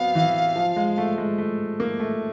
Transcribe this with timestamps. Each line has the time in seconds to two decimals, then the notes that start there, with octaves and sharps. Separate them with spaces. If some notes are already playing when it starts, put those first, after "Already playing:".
Already playing: F#3 B3 C4 F5
0.15 E3
0.56 F3
0.76 G#3
0.97 A3
1.18 G#3
1.38 A3
1.80 A#3
2.00 A3